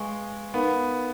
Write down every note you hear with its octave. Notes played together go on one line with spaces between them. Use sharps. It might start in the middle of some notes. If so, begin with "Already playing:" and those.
Already playing: G#3 B4 F5 G#5 C#6
B3 D#4 A#4 F5 B5